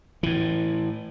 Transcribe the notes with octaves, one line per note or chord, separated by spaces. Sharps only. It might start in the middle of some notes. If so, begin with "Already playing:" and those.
A2 E3